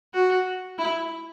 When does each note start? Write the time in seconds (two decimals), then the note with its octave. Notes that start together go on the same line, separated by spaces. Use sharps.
0.14 F#4
0.78 E4